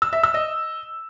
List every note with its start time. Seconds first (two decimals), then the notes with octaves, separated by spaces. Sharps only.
0.02 E6
0.13 E5
0.23 E6
0.34 D#5